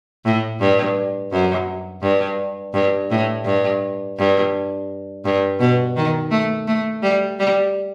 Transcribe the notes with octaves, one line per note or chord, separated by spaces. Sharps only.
A2
G2
F#2
G2
G2
A2
G2
G2
G2
B2
D#3
A3
A3
G3
G3